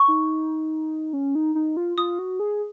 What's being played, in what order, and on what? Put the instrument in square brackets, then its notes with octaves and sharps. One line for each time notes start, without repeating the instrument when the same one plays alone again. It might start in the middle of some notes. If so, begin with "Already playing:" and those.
Already playing: [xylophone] C#6
[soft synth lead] D#4
C#4
D#4
D#4
F4
[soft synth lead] F4 [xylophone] D#6
[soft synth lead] F#4
G#4